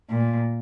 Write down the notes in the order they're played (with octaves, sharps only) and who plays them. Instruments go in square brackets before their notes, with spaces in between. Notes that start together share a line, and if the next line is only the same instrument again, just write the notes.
[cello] A#2